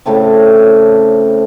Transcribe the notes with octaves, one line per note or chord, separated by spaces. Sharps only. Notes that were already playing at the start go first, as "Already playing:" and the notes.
A2 C#3 A3 C4